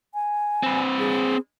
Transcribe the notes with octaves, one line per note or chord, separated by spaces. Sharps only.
G#5
C4 B4
G#4